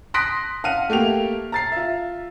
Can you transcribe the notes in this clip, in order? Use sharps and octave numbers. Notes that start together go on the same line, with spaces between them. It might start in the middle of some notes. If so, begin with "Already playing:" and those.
C6 D#6 F#6 A#6 B6 D7
F5 F#5 F6 D#7
A3 A#3 G4 F7
A#5 A6 C7
F4 E5